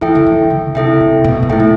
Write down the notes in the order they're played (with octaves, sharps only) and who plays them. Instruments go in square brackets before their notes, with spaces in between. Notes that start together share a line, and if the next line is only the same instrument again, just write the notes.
[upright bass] E3 [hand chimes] E4 A4 E5 G5
[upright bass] D3
E3
D3
[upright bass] C3 [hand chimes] E4 A4 E5 G5
[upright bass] C3
B2
B2
[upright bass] A2 [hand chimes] E4 A4 E5 G5
[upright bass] A2